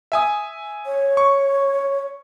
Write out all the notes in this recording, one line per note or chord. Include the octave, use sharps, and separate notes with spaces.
E5 G#5 D#6
C#5
C#6